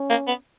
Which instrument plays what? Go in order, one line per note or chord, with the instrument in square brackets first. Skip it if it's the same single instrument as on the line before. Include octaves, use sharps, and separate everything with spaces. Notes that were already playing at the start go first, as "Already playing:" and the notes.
Already playing: [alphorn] C#4
[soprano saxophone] A#3
B3